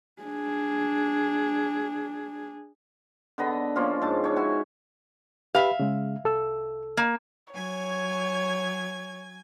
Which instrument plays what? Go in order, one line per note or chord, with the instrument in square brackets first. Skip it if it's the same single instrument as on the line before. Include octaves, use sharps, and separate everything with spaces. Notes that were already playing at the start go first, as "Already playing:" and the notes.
[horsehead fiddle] D4 G#4
[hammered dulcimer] D3 B3 D#5 B5
F3 A#3 C#4 F4
G#2 A5
C#4 D4 C#5
E4 F#4 G#5
[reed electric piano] G4 B4 B5 [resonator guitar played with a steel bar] E5 F5
[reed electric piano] C#3 G#3
C2 A4 E6
[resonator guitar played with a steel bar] A#3
[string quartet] F#3 G#5 G#6 [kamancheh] C#5